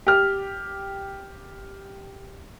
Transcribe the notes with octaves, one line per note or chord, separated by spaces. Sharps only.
G4 F6